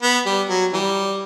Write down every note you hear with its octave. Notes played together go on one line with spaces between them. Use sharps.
B3
G3
F#3
E3 G3